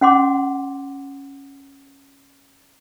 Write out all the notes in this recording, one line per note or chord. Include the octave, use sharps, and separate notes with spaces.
C#4 F#5 C6 D6